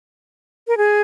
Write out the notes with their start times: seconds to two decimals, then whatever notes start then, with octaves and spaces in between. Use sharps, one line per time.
0.68 A#4
0.78 G#4